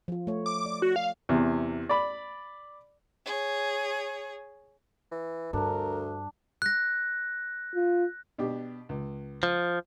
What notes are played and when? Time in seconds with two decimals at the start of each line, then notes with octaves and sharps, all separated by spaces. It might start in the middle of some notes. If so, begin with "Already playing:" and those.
0.08 F3 F4
0.27 A3 C#5
0.46 D6
0.66 D5
0.82 F#4
0.96 F5
1.29 E2 C3
1.89 D5 B5
3.25 G#4 C#5
5.11 E3
5.53 D2 G2 D4 A#4
6.62 F#6 A#6
7.75 F4
8.38 B2 D4 G4
8.89 C#2
9.43 F3